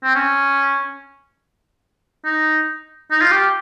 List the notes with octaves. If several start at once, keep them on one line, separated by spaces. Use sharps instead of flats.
C4
C#4
D#4
D#4
F4
G4